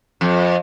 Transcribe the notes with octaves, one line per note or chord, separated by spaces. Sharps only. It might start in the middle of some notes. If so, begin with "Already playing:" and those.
F2